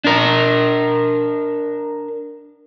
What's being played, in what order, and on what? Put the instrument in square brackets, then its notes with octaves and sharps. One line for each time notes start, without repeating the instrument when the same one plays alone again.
[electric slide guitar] D4 A#4